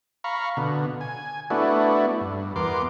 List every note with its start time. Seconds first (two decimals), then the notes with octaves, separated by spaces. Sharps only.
0.24 F5 A#5 B5 C#6
0.57 B2 D3
1.01 G#5
1.50 A3 B3 D4 E4 F#4
2.21 G2
2.56 E2 B3 A#4 C6 D6